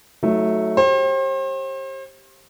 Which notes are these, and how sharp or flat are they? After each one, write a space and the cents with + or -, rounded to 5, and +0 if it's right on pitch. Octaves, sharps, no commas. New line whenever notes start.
F#3 +0 A3 +0 D#4 +35
G4 +0 C5 +40